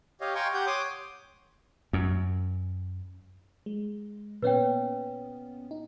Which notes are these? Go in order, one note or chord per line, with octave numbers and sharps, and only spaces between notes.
G4 C#5 D#5 F5
F5 G5 G#5 A#5 C6 C#6
G4 F#5 G6
C#5 C6 D6 D#6
F#2
G#3
A#2 B3 C#4 B4 C#5 G5
D#4